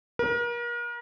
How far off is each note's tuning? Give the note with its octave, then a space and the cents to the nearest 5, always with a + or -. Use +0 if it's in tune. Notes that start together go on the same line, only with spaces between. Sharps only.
A#4 +35